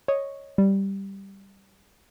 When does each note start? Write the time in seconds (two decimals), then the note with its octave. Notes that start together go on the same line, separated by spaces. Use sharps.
0.08 C#5 D#5
0.58 G3